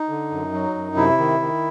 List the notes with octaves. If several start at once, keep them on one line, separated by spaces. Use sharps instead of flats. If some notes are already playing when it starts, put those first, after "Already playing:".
Already playing: D#4
D3
F#2
F#3
F#2
C3 E4
D#3
D#3